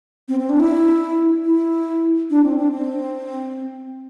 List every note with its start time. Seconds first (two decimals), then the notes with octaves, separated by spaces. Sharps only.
0.29 C4
0.39 C4
0.49 D4
0.60 E4
1.45 E4
2.30 D4
2.44 C4
2.58 D4
2.72 C4